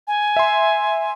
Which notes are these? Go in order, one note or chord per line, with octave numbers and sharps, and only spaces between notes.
G#5
E5 C6